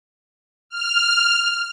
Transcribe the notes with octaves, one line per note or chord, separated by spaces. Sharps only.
F6